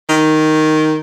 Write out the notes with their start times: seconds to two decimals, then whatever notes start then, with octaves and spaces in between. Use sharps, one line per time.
0.09 D#3